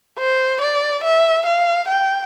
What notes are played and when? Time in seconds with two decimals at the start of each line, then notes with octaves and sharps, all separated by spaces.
0.20 C5
0.61 D5
1.04 E5
1.46 F5
1.88 G5